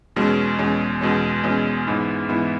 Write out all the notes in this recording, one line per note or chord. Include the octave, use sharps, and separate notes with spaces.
E2 B2 G#3 C#4
E2 B2 G#3 C#4
E2 B2 G#3 C#4
E2 B2 G#3 C#4
G#2 E3 B3 E4
G#2 E3 B3 E4